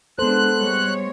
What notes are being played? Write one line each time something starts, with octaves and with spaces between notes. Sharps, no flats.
G#3 B3 D4 A4 C5 F#6
G3 G#3 C#5